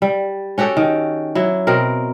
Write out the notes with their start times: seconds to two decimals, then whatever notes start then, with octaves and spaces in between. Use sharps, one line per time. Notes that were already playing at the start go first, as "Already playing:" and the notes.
0.02 G3
0.58 C#4 F#4 G4 A4
0.77 D#3
1.35 F#3 E4
1.67 B2 C4 A#4